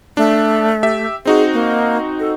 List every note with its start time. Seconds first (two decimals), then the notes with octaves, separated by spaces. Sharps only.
0.17 A3 D4
0.83 G4 E5
1.25 C4 D#4 F#4 G#4
1.54 A#3
2.20 A4